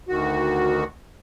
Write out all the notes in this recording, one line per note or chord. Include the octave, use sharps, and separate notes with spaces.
D2 D#3 F#4